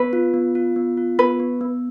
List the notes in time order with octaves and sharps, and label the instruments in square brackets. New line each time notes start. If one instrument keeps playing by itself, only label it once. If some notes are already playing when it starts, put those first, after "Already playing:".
Already playing: [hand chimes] B3 [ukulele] B4
[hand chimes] F4
B3
F4
B3
F4
[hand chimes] B3 [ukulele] B4
[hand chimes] B3
B3